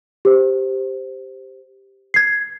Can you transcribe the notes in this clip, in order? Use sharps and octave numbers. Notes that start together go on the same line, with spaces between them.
G4 C5
G#6 C7